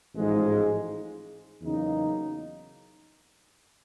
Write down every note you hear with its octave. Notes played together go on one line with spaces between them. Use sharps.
A1 G#2 F3 G#3
E2 C#3 F#3 A#3 D#4